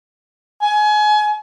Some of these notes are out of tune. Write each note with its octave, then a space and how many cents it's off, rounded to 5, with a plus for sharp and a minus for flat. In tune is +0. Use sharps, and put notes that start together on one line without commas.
G#5 +30